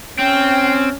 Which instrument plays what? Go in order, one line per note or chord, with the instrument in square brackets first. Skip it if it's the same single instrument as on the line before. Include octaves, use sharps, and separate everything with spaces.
[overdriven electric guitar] C4 [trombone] C#4 [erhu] G5